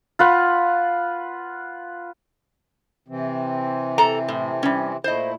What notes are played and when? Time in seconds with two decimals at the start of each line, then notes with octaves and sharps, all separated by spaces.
0.19 F4 B4 F#5
3.08 C3 E3 C4
3.98 A4 A#5
4.28 A2
4.63 G3 C#4
5.04 A#2 A3 E4 C5 D#5